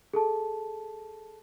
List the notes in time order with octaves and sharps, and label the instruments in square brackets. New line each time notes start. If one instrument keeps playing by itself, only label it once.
[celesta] G#4 A4 A5